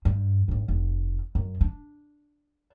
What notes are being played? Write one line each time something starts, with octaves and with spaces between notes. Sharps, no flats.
G2
G#1 C#3
F1
F#2
D4